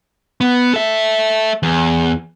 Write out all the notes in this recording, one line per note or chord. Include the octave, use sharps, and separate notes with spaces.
B3
A4 E5
E2